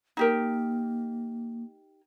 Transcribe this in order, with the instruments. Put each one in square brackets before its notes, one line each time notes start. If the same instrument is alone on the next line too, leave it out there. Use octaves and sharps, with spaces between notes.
[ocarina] A#3 [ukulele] D#4 G4 A#4